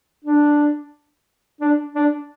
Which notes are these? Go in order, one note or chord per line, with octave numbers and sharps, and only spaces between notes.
D4
D4
D4